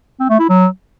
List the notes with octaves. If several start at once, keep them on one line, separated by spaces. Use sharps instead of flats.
C4
A3
E4
F#3